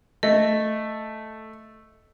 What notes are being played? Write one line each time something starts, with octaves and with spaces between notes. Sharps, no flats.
A3 D#5